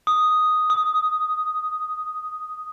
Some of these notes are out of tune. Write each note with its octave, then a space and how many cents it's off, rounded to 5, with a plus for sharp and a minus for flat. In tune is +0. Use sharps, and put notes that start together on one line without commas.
D#6 +0
D#6 +15